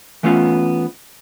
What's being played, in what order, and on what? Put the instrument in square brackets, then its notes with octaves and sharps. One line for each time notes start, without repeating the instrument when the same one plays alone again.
[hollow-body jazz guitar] E3 A3 B3 C#4 F4